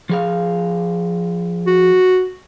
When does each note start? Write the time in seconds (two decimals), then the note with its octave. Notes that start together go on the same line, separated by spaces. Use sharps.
0.09 F3 G#4 F5
1.67 F#4